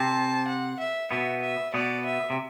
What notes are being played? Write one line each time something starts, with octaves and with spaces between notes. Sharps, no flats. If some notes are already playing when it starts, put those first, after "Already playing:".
Already playing: C3 C4 A5
F#5
E5
B2 B3 E5
E5
B2 B3 D5
E5
C3